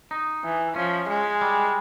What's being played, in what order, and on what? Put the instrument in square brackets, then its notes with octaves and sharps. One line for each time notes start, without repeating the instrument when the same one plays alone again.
[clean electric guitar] D#4
[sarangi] E3
[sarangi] F3 [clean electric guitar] C#4
[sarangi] G#3
[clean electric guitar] G3